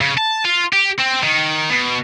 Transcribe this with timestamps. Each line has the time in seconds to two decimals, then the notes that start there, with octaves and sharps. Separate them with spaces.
0.01 C#3
0.18 A5
0.45 F4
0.73 G4
0.99 C4
1.23 D#3
1.70 B2